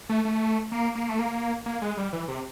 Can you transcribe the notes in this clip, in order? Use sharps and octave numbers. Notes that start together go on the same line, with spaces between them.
A3
A3
A#3
A#3
A3
A#3
A#3
G#3
G3
E3
C3